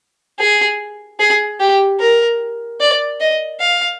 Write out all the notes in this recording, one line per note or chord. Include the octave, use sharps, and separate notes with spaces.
G#4
G#4
G4
A#4
D5
D#5
F5